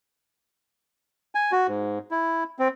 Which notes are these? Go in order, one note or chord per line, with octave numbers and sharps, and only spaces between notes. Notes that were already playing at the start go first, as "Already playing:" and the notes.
G#5
F#4
G#2
E4
C4